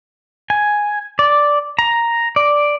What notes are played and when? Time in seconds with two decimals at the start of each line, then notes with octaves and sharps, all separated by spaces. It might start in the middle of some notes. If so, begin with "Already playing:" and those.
0.50 G#5
1.19 D5
1.79 A#5
2.36 D5